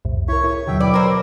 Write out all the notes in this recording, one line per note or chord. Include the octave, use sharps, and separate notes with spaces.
C2 F2 A2
E4 A#4 C#5 C#6
E4 G#4
D#2 B2 D3 F#3 E5 G5
E4 B4 D5 G5
A#4 C5 F6 G#6